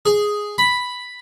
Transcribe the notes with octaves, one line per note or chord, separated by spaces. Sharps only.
G#4
B5